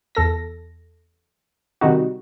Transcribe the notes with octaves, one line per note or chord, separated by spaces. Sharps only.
E2 A4 A#6
C3 D#3 G3 D#4 F#4